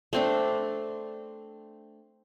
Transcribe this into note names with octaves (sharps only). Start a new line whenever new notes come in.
A3 C4 D4